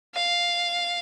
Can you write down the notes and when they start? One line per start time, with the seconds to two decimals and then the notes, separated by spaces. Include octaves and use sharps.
0.15 F5